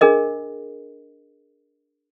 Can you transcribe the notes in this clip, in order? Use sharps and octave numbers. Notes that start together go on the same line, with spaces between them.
D4 G#4 A#4 D#5